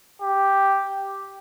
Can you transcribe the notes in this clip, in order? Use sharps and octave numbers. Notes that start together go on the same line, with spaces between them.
G4